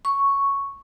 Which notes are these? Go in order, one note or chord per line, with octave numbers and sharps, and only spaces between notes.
C#6